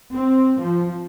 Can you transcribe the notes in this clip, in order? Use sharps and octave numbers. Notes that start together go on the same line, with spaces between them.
C4
F3